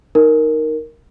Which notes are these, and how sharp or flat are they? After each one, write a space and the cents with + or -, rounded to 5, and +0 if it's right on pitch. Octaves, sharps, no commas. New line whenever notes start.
D#4 +0 A#4 +0